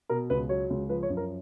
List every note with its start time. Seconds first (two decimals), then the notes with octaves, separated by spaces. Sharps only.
0.09 B2 A#4
0.30 C#2 B4
0.49 F#3 C#5
0.70 C#2
0.89 F3 B4
1.03 C#5
1.10 F#2
1.17 A#4